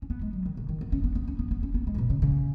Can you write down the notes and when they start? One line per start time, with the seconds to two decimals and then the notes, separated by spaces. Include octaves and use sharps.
0.02 C#4
0.10 B3
0.21 G#3
0.33 F#3
0.46 D#3
0.57 C#3
0.69 D#3
0.81 B3
0.92 C#4
1.04 B3
1.15 B3
1.28 C#4
1.39 B3
1.51 B3
1.63 C#4
1.74 B3
1.87 G#3
1.95 C#3
1.98 B2
2.10 C#3
2.22 C#3